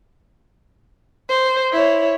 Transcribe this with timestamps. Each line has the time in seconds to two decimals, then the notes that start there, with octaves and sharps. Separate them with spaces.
1.29 C5
1.72 E4 C#5